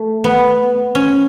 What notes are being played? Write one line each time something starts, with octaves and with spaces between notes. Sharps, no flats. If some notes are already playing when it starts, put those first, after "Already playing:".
Already playing: A3
B3
C#4